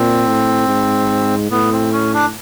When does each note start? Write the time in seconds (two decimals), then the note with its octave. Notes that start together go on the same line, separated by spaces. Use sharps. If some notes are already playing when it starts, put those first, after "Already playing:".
Already playing: A#2 C4
0.27 A2
0.68 G#2
1.51 A2 B3
1.72 C4
1.93 C#4
2.14 D4